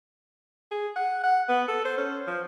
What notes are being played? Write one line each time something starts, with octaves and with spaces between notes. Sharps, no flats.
G#4
F#5
F#5
B3
A4
C5
C#4
F3